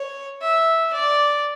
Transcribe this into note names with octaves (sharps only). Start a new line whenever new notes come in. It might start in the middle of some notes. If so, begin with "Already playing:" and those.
Already playing: C#5
E5
D5